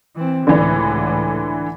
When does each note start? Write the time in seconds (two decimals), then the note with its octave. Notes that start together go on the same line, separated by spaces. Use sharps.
0.15 E3 C4
0.47 C#2 A2 D3 E3 D4